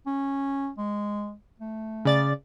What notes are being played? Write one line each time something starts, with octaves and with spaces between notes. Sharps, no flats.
C#4
G#3
A3
C#3 D5 A6